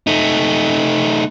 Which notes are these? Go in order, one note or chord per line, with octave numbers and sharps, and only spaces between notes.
A3 D#4